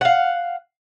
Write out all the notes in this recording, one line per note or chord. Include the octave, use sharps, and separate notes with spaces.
F5 F#5